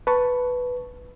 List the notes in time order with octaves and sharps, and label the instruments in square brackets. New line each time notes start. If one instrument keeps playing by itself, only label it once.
[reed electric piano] B4 A5 C#6